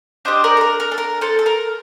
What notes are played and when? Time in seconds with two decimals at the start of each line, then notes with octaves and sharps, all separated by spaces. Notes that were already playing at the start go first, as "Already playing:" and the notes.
0.25 D4 G4 C5 D#5
0.44 A#4 D5
0.57 A4
0.61 A#4
0.80 A#4
0.92 A4
0.98 A#4
1.21 A4 C5
1.39 A4
1.46 A#4